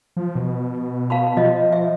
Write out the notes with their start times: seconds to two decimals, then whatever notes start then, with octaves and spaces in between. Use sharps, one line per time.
0.17 F3
0.35 B2
1.10 F5 A5 B5
1.37 F3 F4 D#5
1.72 E5